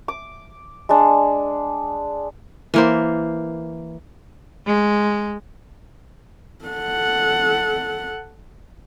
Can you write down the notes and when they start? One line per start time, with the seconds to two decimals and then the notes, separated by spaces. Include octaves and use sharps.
0.08 D6
0.89 G#3 D4
2.74 E3 A#3 C5
4.67 G#3
6.65 A4 F#5